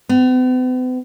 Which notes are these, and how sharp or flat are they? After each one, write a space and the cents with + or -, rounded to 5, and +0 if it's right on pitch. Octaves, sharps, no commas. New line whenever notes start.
B3 +45